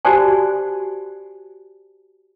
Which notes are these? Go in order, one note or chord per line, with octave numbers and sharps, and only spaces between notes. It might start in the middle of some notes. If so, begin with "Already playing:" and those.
F#4 G4 C5 D5 G#5 A5